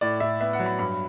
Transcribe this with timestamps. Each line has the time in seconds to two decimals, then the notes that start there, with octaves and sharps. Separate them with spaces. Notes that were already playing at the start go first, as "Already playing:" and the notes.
0.01 A2 D5
0.20 A2 E5
0.40 B3 E5
0.53 F#5
0.60 F#3
0.66 B5
0.79 G2 B5